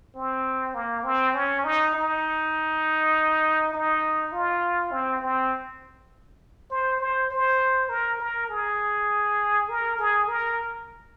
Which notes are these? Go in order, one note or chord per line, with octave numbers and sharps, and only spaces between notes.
C4
A#3
C4
C#4
D#4
D#4
D#4
F4
C4
C4
C5
C5
C5
A#4
A#4
G#4
A#4
G#4
A#4